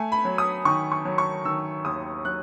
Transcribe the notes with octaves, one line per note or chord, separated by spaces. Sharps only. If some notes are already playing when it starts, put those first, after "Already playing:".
Already playing: A3 G#5
B5
F#3
D#6
D#3 C#6
C#6
F#3
C#6
D#3 E6
D#2 D#6
F#3 F#6